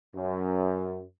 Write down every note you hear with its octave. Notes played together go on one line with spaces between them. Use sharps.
F#2